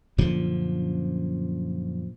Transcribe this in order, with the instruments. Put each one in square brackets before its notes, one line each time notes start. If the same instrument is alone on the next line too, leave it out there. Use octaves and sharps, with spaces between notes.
[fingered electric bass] F#2 A#2 D3 F3